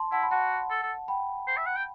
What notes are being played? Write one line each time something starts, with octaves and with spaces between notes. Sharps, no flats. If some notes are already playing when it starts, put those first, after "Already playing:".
Already playing: A5 C6
E4 F#5 A5
B5
F#4 F#5 A5
A4
A4
G5 B5
C5
E5
F#5
G5